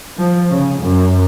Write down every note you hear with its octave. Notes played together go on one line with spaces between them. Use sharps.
F3
C#3
F#2